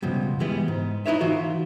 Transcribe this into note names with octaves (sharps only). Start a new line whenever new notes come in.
C#2 G2 B2 F3 G3
E3 G3 G#3 B3
G#2
D#4 E4 F#4 B4 C#5 E5
E3 D#4 F4 F#4